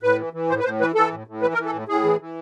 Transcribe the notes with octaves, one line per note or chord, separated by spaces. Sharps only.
A2 B4
E3
E3
A2 C5
B4
A2 C5
E3 B4
E3 A4
A2
A2
E3 B4
A#4
E3
A4
A2
A2 G#4
E3
E3